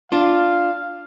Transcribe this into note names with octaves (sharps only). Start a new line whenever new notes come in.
D4 F4 F5